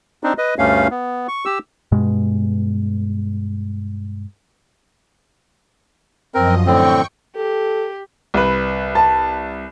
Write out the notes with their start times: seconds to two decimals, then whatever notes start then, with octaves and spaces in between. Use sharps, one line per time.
0.23 C4 D4 D#4
0.38 B4 D#5
0.59 D2 G2 A3 C#4 F5
0.91 B3
1.28 C#6
1.45 G4 E6
1.92 G2 B2 G#3
6.35 F#2 F3 C4 A#4 D#5
6.67 A2 D3 C4 G5 C#6
7.36 G4 A4
8.34 C2 B4
8.95 A5